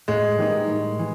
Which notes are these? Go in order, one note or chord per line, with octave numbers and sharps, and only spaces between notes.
A2 G#3
E3 G3 A#3 D#4
A2
E3